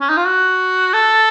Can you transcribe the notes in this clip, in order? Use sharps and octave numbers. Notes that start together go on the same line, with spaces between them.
C#4
D#4
F4
F#4
A4